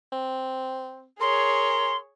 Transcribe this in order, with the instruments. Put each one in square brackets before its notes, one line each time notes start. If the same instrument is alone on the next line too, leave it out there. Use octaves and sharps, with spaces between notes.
[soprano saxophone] C4
[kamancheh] G#4 C#5 [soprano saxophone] A#4 [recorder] C6